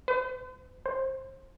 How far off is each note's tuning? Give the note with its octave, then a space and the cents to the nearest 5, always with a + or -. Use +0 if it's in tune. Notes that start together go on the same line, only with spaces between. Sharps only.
C5 -40
C5 +20